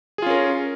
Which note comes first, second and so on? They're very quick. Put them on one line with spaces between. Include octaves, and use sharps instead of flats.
G#4 F4 C#4 A#4